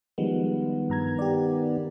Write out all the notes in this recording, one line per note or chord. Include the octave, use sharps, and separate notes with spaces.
D#3 F3 G3 G#3 B3
G2 A#5 G#6
G4 D5